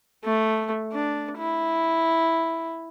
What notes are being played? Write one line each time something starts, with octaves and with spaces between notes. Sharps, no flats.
A3
D4
E4